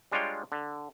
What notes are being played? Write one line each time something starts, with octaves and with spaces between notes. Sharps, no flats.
G3 G#3 D4 F4 C#5 G5
D3